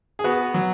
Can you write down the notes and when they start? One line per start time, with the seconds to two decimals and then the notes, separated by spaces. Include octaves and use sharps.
0.19 G#4
0.24 B3 F#4
0.54 F#3